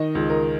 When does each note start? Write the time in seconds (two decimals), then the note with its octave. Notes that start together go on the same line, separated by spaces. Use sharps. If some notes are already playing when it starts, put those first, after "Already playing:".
Already playing: D#3 D#5
0.15 C#2
0.30 A#4